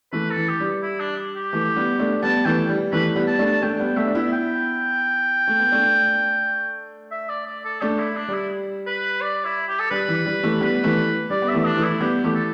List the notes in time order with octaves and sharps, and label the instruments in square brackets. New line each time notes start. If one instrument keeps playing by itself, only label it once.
[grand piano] E3 A3 [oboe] B4
[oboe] A4
[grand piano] E3
[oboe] G4
[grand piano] G3
[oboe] E4
D4
G4
[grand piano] E3 A3
G3 B3
A3 D4
[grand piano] G3 B3 [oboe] A5
[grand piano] E3 A3 [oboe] G5
[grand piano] G3
[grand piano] E3 A3 [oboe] B4
[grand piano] G3 B3
[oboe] A5
[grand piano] A3 D4
[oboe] A5
[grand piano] A3 D4 [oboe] G5
[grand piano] G3 B3
[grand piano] A3 D4 [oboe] E5
[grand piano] D4
B3 E4
[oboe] G5
[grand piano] A3
B3
A3 D4
[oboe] E5
D5
D5
A4
[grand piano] A3 D4 [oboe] G4
[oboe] E4
D4
[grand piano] G3
[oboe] E4
B4
D5
E4
G4
A4
[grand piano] G3 [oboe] B4
[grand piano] E3
G3
E3 A3
[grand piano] G3 B3 [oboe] B4
[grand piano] E3 A3
[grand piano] G3 [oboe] D5
[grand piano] B3
[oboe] E5
[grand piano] E3 A3
[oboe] D4
[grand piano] E3 A3
[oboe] E4
[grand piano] G3 B3 [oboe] G4
[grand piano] E3 A3 [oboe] G4
[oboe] A4